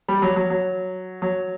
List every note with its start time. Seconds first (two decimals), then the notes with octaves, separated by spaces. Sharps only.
0.09 G3
0.22 F#3
0.36 F#3
0.50 F#3
1.22 F#3